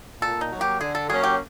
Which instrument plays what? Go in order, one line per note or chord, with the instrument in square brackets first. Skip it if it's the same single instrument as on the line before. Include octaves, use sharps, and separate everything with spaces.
[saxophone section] A#2 [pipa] A4
[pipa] D#4
[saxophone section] F#3 A#3
[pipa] G4
[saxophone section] D3 [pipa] G#4
[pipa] A4
[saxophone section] F#3 A#3 C#4 [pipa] G#4
[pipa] G4